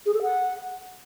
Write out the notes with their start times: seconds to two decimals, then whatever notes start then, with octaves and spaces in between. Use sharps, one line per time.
0.06 G#4
0.14 A4
0.22 F#5